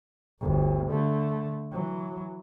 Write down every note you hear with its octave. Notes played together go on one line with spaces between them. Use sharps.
G1 D2
D3 A3
E3 F#3